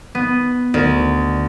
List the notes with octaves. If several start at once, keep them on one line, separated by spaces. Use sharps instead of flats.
B3
D2